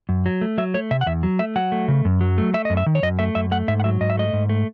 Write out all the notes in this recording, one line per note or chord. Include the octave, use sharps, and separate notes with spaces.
F#2
F#3
A3
F#3 E5
A3 C#5
C3 E5
F#5
E2 E5
F#3
A3 E5
F#3 F#5
A3
C#3
F#2
F#3
A3
A3 E5
F#2 D#5
E5
D#3
C#5
F#2 D#5
A3 E5
F#2 E5
A3 F#5
G#2 E5
F#5
F#3 E5
G#2 D#5
E5
A3 D#5
G#2
A3